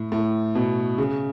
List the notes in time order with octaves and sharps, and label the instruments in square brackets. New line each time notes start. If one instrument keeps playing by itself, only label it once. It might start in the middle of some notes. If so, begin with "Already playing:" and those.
Already playing: [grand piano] A2
A2
B2
C#3